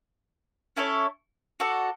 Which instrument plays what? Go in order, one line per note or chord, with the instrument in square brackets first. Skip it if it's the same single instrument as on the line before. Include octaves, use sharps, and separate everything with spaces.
[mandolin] C#4 E4 A4 C#5
F#4 A4 D5 F#5